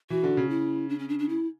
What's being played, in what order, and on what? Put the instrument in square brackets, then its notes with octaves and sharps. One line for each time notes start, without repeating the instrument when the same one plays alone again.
[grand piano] E3 [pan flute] F#4
[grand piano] D3
C#3
[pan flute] E4
D4
C#4
D4
D4
E4